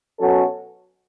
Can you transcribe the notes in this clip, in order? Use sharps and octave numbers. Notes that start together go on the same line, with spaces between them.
B2 F#3 C#4 F#4 A4